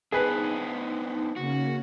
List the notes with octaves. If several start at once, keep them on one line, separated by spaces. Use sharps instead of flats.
B3 C4 D4 D#4 G#4 B4
C#3 A#3 C#4 F#4